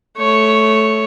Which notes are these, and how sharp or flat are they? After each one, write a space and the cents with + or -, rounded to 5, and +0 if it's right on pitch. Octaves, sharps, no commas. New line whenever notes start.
A3 -10 C#5 +0